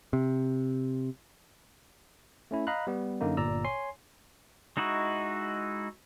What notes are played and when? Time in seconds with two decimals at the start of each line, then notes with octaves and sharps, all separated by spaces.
0.13 C3
2.51 A3 C#4 E4
2.67 D#5 F5 A#5 B5 F#6
2.87 G3 B3
3.21 F#2 D3 A#3 D#4
3.37 G1 A#2 D5 A#5 E6
3.65 C#5 G#5 C6 C7
4.77 G#3 D#4 E4 F#4